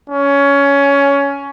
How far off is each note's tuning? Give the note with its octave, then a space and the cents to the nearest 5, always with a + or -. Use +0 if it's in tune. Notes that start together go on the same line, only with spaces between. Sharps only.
C#4 +15